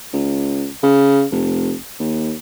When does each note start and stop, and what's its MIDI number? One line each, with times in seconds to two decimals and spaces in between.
0.13 0.68 37
0.83 1.24 49
1.32 1.74 29
2.00 2.33 39